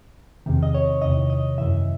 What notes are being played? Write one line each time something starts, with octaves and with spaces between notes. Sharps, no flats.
E2 C3 D#3
D#5
C#5
E2 C3 D#3 D#5
D#5
F#2 E3 E5